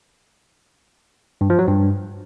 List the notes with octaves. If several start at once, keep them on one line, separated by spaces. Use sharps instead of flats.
G2
F3
F#3
G2